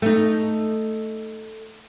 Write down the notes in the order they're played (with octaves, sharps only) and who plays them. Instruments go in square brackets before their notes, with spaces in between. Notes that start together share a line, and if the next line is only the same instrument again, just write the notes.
[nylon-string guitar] A3 D#4